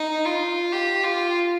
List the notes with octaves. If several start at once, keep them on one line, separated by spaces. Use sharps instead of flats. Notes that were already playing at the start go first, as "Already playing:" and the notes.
Already playing: D#4
F4
G4
F4